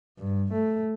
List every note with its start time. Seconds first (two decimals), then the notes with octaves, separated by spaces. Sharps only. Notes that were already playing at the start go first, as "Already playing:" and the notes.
0.19 G2
0.53 A3